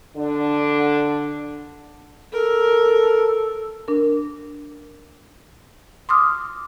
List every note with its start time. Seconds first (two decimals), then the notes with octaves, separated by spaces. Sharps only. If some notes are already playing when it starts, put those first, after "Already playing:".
0.15 D3 D4
2.32 A4 A#4
3.88 D4 A#4
6.09 C6 D6 D#6 F6